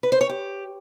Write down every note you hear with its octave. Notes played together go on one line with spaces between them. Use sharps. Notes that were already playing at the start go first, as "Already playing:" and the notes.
B4
C5
C#5
G4